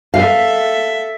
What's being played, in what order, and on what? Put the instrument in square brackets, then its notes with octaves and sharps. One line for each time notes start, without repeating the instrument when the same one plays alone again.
[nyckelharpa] A4 E5 [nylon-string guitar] F5